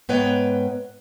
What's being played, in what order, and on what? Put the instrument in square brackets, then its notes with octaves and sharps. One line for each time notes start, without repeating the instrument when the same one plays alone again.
[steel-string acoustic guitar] G#2 B3 B4 C#5 G5